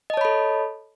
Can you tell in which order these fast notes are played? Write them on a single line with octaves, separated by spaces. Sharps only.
D#5 A5 C#5 B5 A4